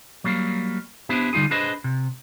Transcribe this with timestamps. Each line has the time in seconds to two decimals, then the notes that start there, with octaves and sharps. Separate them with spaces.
0.24 F#3 G3 A#3
1.09 B3 D4 E4 G4 C5
1.33 D3 G3 D#4 F4 G#4
1.51 D4 G#4 B4 C5 D#5
1.84 C3